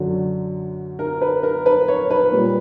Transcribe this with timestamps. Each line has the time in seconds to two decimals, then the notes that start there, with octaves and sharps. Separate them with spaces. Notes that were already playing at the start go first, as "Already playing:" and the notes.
Already playing: F#2 D3 F#3
0.99 A#4
1.21 B4
1.43 A#4
1.66 B4
1.88 C#5
2.10 B4
2.32 A#2 G3